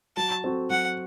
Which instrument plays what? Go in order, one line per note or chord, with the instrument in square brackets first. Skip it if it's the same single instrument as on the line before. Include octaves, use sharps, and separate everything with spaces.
[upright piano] F#3 [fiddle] A5
[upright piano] C4 F#4 A4
[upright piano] F#3 [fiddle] F#5